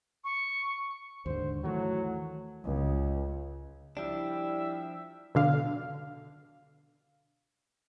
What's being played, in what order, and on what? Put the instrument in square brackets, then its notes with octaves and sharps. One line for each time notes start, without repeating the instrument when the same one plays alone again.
[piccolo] C#6
[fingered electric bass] D#2 G#2 D3 [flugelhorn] C5
[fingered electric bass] D#3 E3 A3 [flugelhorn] F#3
[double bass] C#2
[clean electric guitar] F3 D4 [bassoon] G3 [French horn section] E4 [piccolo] E5
[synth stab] B2 D3 F5